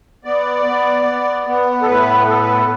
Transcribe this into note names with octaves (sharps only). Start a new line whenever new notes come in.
B3 D5
B3
B3
B3
A4
A2 B4
B3 A4
B4
A4